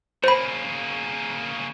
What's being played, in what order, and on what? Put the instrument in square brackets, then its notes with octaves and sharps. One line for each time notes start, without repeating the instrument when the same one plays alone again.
[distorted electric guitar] C#3 A#3 [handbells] C5 B5